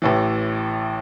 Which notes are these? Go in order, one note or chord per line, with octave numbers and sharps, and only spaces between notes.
A1 A2 E3